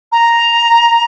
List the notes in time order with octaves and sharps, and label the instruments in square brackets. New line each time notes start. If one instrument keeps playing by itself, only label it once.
[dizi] A#5